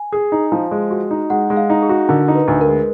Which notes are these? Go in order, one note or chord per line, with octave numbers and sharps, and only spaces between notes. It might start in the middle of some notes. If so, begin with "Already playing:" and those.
Already playing: G#5
G#4
D#4
F3
G#3
F#4
D#4
G#3 F#5
G#3
F5
D#4
G#4
F#4
D3 A#4
D#4
B4
D2
A#4
G#3